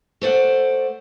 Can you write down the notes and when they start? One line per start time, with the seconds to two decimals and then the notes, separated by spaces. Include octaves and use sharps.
0.22 A3 C5 D5 F#5